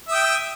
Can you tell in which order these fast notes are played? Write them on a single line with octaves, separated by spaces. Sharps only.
E5 D#6 G5